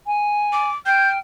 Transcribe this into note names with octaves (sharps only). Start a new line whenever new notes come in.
G#5
D6
G5 F6 G6